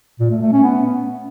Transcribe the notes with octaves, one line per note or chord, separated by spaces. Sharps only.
A#2
A3
A3
C#4
B3